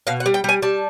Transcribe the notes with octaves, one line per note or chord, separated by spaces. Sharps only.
B2 F5
F#5
G3
G5
G3 G#5
G3 A5